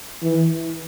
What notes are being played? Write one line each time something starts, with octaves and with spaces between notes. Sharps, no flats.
E3